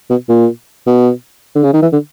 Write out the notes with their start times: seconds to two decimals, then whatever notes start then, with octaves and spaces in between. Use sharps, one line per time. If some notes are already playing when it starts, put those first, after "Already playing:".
0.10 B2
0.29 A#2
0.87 B2
1.55 D3
1.64 C#3
1.73 D#3
1.82 E3
1.92 D3